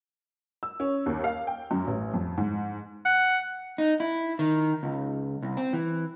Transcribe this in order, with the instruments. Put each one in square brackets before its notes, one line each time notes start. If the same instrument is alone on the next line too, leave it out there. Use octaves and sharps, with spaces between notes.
[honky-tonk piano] E6
C#4
D#2
F5
G5
F#2
A1
F2
G#2
[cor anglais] F#5
[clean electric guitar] D#4
E4
D#3
C#2
C2
C4
E3